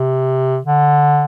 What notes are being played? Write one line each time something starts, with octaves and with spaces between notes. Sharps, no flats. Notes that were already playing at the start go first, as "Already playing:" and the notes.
Already playing: C3
D3